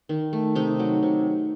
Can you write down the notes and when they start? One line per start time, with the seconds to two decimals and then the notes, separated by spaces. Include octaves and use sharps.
0.09 D#3
0.33 A3
0.55 C3 D#4
0.79 F#3
1.03 C3